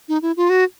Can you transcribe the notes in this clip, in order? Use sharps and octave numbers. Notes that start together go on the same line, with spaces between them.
D#4
E4
F4
F#4